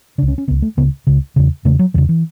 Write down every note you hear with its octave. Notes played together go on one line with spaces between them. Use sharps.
C#2 C#3 D4
C#4
C#4
C#2 C#3 B3
A3
C#2 C#3 B3
C#2 C#3
E2 C#3
E2 C#3 A3
F#3
E2 C#3 E3
E3